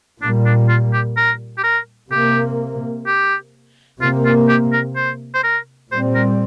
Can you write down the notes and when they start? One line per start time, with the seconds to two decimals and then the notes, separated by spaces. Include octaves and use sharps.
0.21 A#2 G3 A#3 D4
0.46 D4
0.69 F4
0.93 G4
1.17 A#4
1.58 G4
1.64 A#4
2.11 C3 A#3 G4
3.06 G4
4.01 C3 A#3 F4
4.25 F4
4.49 G4
4.73 A#4
4.96 C5
5.34 C5
5.44 A#4
5.91 A#2 G3 C4 C5
6.15 A#4